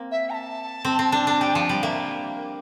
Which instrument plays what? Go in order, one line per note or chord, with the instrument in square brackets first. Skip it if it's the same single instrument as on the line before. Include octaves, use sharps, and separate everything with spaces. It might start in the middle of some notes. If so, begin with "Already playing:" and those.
Already playing: [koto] A#3 C4
[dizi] E5
A#5
A5
[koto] C4
C4
D4
D4
[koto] G3 [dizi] G5
[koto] F3 [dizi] A5
[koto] G3 [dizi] G5
[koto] A#3 [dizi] E5